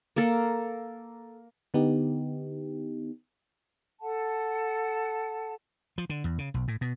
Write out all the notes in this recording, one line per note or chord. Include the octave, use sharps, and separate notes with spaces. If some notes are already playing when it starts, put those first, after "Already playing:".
A#3 A4
D3 B3 D#4 G4
A4 F#5 A5
F3
D3
E2
C#3
B1
A2
B2